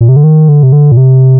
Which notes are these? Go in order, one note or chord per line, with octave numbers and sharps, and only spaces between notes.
A#2
C3
D3
D#3
D3
C3
D3
A#2
C3